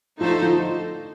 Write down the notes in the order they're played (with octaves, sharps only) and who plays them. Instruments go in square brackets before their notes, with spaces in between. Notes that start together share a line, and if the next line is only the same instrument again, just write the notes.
[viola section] D3 A3 D#4 A4 C5 [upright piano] F3
[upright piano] F3